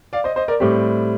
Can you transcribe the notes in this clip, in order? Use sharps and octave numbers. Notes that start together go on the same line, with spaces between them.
D5 F5
C5 D#5
C5 D#5
A#4 D5
A2 G3 C4 G4